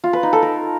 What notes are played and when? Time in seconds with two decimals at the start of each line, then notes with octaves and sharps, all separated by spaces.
0.04 F4
0.13 B4
0.23 D#4
0.33 A4
0.43 A#4